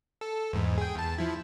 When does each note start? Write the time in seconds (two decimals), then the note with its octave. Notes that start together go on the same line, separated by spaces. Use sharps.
0.21 A4
0.53 E2 G#2
0.78 G#4 G5
0.95 E2 A5
1.18 F3 E4